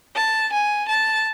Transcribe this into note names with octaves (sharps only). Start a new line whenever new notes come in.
A5
G#5
A5